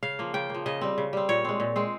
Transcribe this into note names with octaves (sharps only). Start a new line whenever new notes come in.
C#3 F5
F3 A#3
C#3 G5
F3 A#3
C#3 D#5
G3 C4
C#3
G3 C4
A#2 C#5
G#3 C4
A#2
G#3 C4